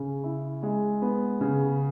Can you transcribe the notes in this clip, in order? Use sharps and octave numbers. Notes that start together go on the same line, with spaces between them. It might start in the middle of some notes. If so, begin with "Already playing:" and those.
Already playing: C#3
E4
G#3
B3
C#3